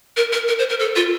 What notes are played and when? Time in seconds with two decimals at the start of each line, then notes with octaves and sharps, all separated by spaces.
0.17 A#4
0.32 A#4
0.48 A#4
0.59 C5
0.69 A#4
0.80 A4
0.96 F4